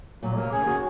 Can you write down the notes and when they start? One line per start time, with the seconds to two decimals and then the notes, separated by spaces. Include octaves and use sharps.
0.22 A#2 F#3
0.37 C3 A#3
0.52 C#3 G#4
0.62 D#3
0.67 C#3 F#4